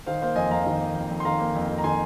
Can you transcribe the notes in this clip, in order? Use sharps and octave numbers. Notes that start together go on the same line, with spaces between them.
D#3 C5 F5
A#3 C5 F5
F2 D#5 G#5
F2 F5 A#5
D#3
A#3
F2
F2
C6
D#3 F5 A#5
A#3
F2
F2
A#5
D#3 G#5 C6